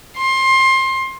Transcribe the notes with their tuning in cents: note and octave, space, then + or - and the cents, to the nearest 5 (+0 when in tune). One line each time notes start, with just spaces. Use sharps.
C6 +25